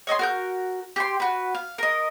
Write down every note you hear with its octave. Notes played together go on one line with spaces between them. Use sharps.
C#5 D#5 A5 C6
F#4 A#4 G6
G4 G5 C6
F#4 B4
F5
A#4 D#5